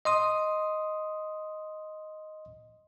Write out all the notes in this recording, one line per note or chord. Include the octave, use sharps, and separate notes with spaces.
D#5 C6 D#6